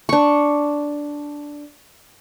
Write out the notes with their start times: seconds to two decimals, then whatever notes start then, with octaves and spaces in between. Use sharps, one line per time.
0.09 D4 C#6